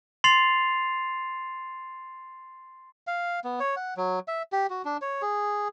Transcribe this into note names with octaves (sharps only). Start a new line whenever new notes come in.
C6 A6 C7 F7
F5
B3
C#5
F#5
F#3
E5
G4
F#4
D4
C#5
G#4